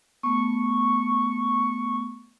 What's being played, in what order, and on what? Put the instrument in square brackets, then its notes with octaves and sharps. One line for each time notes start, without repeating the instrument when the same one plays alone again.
[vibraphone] A3 B3 [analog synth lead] C#6